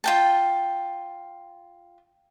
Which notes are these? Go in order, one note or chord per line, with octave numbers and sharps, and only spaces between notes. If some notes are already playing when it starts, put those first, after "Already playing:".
F4 G5 A5